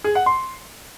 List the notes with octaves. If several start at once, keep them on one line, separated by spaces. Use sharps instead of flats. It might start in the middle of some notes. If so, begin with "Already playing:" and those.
G#4
F#5
C6